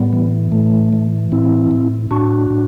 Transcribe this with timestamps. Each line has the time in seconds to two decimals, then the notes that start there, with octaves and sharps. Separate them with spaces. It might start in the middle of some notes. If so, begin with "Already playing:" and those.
Already playing: A2 G3 B3
0.13 E3
0.52 A2 A3
0.93 E3
1.32 A2 C4 E4
1.71 A2
2.11 A2 D4 F#4
2.51 A2